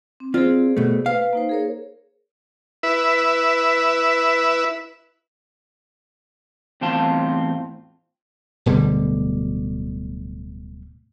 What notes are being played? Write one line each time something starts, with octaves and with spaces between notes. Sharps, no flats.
C4
C4 F4 G#4 C5 D5
B2 A3
B4 F5
A#3 D#4 C5
G#4 A#4 C#5
E4 B4 E5
E2 A2 C4 F4 A5 C6
D1 B2 D3 G3